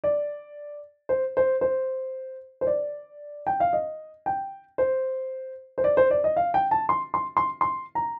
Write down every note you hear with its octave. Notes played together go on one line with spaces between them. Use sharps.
D5
C5
C5
C5
C5
D5
G5
F5
D#5
G5
C5
C5
D5
C5
D5
D#5
F5
G5
A5
C6
C6
C6
C6
A#5